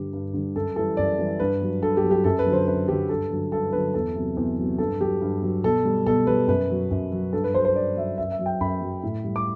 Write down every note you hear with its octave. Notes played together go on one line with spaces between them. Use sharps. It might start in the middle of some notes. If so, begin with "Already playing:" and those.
Already playing: G2 D3 G3 G4
G2
D3 G3
F#2 A4
E3 G3 A4
F#2 D5
E3 G3
G2 B4
F#3
G2 A4
G4
F#3
G4
F#2 A4
B4
D3 F#3
C5
F#2 B4
D3 F#3 G4
G2 A4
D3 F#3
G2 A4
D3 F#3 B4
E2 A4
C3 F#3
E2
C3 F#3
G2 A4
F#3 G4
G2
F#3
B2 A4
G3
B2 A4
G3 B4
F#2 B4
F#3
F#2
F#3
G2 A4
B4
F#3 C5
C5
G2 D5
F#3 E5
F#2 E5
E5
F#3
G5
F#2 B5
F#3
A2
G3
D6